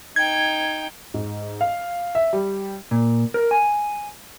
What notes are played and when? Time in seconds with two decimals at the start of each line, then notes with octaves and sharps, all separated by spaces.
0.16 D#4 G5 G#6
1.14 G#2
1.61 F5
2.15 E5
2.33 G3
2.91 A#2
3.34 A#4
3.51 G#5